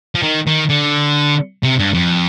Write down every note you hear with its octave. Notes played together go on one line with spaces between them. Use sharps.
F3
D#3
D#3
D3
C3
G2
F2